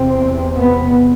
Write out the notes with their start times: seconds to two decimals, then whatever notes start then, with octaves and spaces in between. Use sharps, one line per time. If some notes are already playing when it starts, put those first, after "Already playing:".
Already playing: E2 C3 C4
0.59 B3